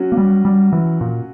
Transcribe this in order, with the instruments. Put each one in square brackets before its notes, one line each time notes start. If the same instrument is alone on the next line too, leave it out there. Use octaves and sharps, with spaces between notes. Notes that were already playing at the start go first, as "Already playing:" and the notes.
Already playing: [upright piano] F#3 C#4 F#4
[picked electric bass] A#3
G3
G3
E3
A#2